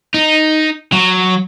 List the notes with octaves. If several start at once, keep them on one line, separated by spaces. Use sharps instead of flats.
D#4
F#3